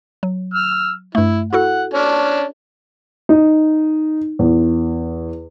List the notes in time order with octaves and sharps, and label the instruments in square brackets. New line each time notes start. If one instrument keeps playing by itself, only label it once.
[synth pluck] F#3
[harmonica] E6 F6
[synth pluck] G2 A3 [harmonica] E4
[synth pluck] E4 F#4 A4 [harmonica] F#5
[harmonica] C#4 D4
[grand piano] D#4
E2